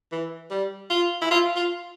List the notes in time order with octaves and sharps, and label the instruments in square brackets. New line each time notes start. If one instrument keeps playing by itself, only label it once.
[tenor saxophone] E3
G3
F4
E4
F4
F4